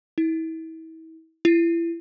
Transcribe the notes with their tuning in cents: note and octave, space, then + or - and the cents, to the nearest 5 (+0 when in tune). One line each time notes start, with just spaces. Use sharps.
E4 -35
E4 +30